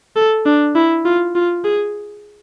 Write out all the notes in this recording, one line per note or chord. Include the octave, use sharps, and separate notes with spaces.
A4
D4
E4
F4
F4
G#4